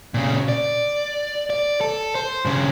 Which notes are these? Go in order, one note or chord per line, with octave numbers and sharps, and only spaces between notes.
A#2 C#3
D5
D5
A4
C5
G2 C#3